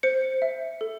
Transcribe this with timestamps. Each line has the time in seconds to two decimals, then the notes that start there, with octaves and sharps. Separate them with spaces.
0.03 C5 C#7
0.42 E5
0.81 A4